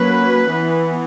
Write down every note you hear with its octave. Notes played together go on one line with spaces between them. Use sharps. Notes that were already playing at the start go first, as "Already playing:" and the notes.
Already playing: F#3 A#3 C#4 B4
E3 B3